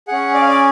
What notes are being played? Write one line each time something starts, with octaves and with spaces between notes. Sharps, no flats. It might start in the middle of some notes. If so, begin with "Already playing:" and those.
C#4 G#4 F#5
D5
F5
D5